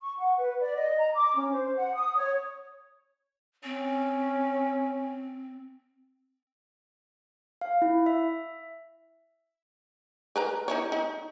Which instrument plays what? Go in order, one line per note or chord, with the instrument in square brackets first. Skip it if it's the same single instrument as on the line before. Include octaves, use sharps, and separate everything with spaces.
[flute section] C#6
F#5
B4
D5
D#5
A#5
D6
C#4
C5
F#5
D#6
C#5
[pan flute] C4 [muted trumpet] C#4
[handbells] F5
E4
E5
[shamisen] A#4 B4 A#5
D#4 E4 C#5
D#4